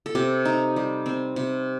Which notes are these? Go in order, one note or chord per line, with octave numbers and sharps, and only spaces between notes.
A4
C3 G4
D#4
G3
C4
C3